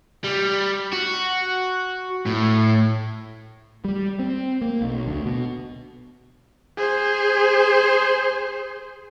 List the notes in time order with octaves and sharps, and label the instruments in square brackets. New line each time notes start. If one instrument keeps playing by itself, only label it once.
[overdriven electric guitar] G3
F#4
A2
[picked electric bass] G3
C4
A#3
B1
D2
B2
[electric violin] G#4 C5